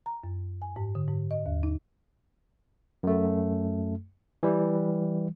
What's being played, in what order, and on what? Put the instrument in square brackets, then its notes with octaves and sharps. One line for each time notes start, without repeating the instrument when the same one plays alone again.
[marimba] A#5
F#2
G#5
G#2
D3
G#2
D#5
D#2
D#4
[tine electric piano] F#2 A3
E3 G3